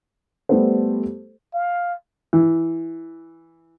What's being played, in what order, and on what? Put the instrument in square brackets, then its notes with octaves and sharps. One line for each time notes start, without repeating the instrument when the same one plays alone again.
[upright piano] G3 A3 B3 G4 A4 C5
[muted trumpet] F5
[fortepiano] E3